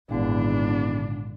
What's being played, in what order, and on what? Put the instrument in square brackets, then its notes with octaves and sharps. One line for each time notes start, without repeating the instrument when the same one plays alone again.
[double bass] G#1 [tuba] E2 [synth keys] A#2 D3 [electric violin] D4